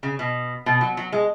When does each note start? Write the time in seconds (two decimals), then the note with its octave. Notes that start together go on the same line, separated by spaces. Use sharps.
0.03 C#3
0.19 B2
0.66 B2
0.81 F#3
0.97 F#3
1.12 G#3